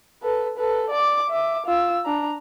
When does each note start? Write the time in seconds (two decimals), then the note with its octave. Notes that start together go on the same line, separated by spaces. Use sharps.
0.22 A4 B4
0.57 A4 B4
0.89 D5 D6
1.30 E5 D6
1.66 F4 E6
2.05 D4 A#5